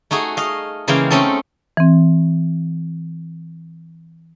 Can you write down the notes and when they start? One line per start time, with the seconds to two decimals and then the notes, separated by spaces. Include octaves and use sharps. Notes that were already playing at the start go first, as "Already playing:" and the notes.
0.11 A3 D#4 F#4 G#4
0.37 D#5 F5
0.88 C#3 E3 G#3 A#3 F5 G5
1.10 A3 C4 C#4 D#4 A4
1.77 E3 C4